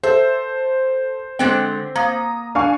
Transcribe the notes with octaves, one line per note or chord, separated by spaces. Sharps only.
A4 C5 E5
D3 G#3 C4 G5
A#3 A#5 D#6
D4 F5 G#5 C#6